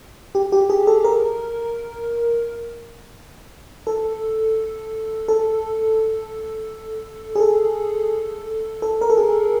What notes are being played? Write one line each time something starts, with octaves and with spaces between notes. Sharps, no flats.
G4
G4
G#4
A4
A#4
A4
A4
G#4
A4
A4
A#4
A4
G#4